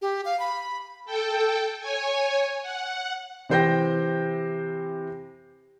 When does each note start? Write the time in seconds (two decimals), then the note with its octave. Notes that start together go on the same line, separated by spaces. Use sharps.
0.02 G4
0.25 F5
0.40 B5
1.05 A4 G5
1.80 C#5 G#5
2.62 F#5
3.49 C3 E3 C5 G5 G6 A#6